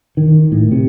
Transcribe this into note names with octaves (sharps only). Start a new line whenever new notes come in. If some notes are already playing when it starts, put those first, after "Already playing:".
D#3
A2
C3